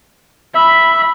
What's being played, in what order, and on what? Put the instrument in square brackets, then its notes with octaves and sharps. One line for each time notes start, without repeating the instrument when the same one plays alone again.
[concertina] E5 [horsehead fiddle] B5